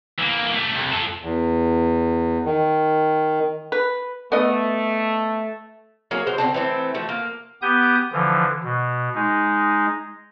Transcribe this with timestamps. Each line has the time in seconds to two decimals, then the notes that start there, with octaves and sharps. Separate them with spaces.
0.19 E3 A#3
0.54 A3 G4
0.74 C2
0.92 F4 A4
1.20 E2
2.45 D#3
3.72 B4
4.32 A3 B3 D#5
6.11 F#3 A#3 G#4
6.27 F#3 G#3 C5
6.38 D3 C4 A5
6.54 E3 A3 B3 C4
6.94 F3 A3 F#4
7.09 A#3
7.62 B3 G4 D#6 G6
8.13 D3 E3 F3
8.64 B2
9.15 G#3 D#4